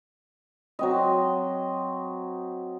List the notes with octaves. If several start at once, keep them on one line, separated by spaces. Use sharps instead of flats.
F#3 C4 D#5